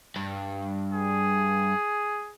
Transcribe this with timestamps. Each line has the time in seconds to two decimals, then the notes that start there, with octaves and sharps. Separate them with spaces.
0.16 G2
0.91 G#4